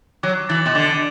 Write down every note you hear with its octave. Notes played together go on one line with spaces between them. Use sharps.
F#3 D6
E3 A6 F#7
B2
D3 D6